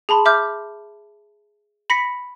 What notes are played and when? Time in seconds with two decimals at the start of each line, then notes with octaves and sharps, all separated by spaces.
0.09 G#4 A5 B5 C6
0.25 E5 D6 F6 G6
1.90 B5 A#6 B6 C#7